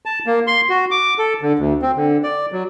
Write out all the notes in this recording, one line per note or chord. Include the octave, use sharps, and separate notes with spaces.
A5
A#3
C6
F#4
D6
A4
D3
D2
C4
D3
D5
F#3